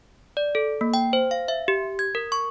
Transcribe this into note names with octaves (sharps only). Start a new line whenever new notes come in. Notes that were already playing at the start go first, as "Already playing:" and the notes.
D5
A4
A#3
G5
C5
F5
E5
G4
G#6
A#4
C#6